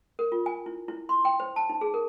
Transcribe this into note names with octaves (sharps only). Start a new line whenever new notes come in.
A#4
F4
G#5
E4
E4
C6
G5
C5
A5
D#4
G#4
A#4